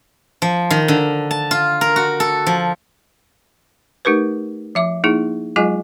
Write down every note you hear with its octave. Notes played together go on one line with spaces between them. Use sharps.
F3
D#3
D3
A5
F4
A#4
F#4
A4
F3
A3 D#4 G4 A#4 B4
F3 E5 D6
A#3 D#4 E4 G#4
F#3 G#3 F4 G#4 D#5 G#5